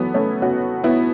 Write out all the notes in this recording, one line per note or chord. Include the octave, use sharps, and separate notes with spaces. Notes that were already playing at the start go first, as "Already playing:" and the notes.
Already playing: E3 F#3 A3 B3
A3 C#4
C#4 F#4
B3 E4